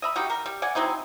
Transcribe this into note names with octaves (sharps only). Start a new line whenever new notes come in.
D#5 E5 B5
G3 D#4 F#4 G4
A#4
G3
D5 F#5 G#5
F#3 C4 D#4 E4